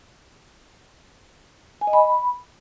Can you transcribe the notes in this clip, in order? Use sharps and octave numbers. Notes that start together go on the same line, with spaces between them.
G#5
D#5
B5